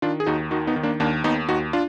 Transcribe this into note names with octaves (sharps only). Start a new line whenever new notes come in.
D#3 D4 F4
G#4
D#2 D#4 F#4
D#3 D#4 F#4
B3 D#4
D#3
A#3 D4
D#2 A#3 D4
D#2 B3 D#4
D#2 D#4 F#4
D4 F4